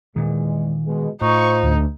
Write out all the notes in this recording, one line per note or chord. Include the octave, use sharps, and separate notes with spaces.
E2 A#2 D#3 G#3
B2 G#3
A2 D#4 F4 C5 C#6
D2